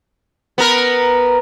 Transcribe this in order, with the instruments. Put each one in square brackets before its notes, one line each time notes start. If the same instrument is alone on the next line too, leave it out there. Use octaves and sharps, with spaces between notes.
[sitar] B3 A#4